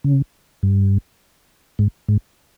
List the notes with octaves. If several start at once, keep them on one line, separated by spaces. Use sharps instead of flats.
C#3
G2
G#2
G#2